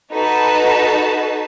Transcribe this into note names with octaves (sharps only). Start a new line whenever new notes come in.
D#4 F#4 A4 B4 A5